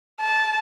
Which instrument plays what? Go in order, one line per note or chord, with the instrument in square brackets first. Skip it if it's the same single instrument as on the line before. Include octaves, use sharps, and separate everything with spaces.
[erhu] A5